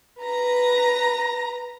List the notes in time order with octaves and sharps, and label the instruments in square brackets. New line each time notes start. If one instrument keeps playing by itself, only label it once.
[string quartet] B4 A#5 A#6